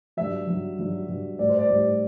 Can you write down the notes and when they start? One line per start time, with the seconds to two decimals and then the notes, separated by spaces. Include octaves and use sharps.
0.17 G2 F#3 E5
0.47 G2 F#3
0.79 G2 F#3
1.09 G2 F#3
1.39 A2 G3 D5
1.49 C5
1.59 D5
1.69 A2 G3